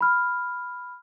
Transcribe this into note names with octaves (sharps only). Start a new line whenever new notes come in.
B5 F6